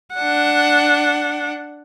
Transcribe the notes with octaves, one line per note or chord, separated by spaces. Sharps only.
D4 F#5